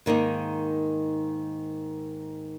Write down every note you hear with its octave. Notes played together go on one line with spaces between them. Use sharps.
G#2 D#3 A#3 D#4